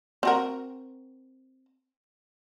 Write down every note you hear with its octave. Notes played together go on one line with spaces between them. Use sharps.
C4 F#4 A#4